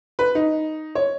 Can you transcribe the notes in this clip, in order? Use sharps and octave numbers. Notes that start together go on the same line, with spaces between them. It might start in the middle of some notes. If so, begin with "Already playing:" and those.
B4
D#4
C#5